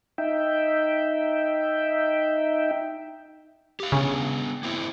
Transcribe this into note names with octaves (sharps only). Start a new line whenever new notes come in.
D#4 E5 G5
G4 F5
C#3 B3 D4
A#3 C4 E4